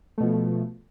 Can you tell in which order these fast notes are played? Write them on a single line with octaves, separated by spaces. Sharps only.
A3 B2 F3